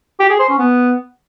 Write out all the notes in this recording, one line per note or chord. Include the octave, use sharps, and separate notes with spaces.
G4
G#4
C5
C#4
B3